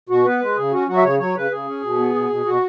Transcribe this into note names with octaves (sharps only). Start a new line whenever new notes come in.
B2 F#4
B3 B4
G#3
C#3 G#4
C#4 F#4
F#3 F#4
E5
C#3 C#5
F#3 C#5
C#3 B4
C#3 G#4
C#4
B2
B3
B2
B2
B2 F#4